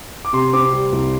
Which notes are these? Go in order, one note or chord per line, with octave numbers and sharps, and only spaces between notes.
D6
C3 C6
C4 D6
G3
C2